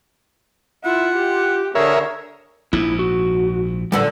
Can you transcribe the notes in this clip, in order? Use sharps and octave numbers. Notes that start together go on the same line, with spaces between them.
E4 F4 F#5
G4
D3 G#4 A#4 C#5 E5
A#1 G#2 E4
F#4
A#2 D3 G3 A4 B4 F#5